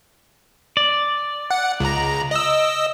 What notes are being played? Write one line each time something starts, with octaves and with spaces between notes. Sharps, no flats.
D5
F#5
C#2 A#5
D#5 E6